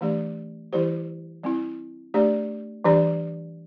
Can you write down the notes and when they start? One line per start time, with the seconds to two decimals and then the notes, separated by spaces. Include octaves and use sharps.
0.01 E3 A3 D4 G4 D5
0.73 E3 G3 E4 G4 C5
1.43 G3 C4 E4
2.14 A3 D4 G4 D5
2.84 E3 G3 D4 G4 D5